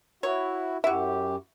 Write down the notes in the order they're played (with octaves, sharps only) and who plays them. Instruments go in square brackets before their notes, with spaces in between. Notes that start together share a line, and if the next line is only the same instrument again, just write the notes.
[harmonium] E4 F#4 [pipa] C#5
[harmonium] F#2 G4 [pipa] E4 F#4 [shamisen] E5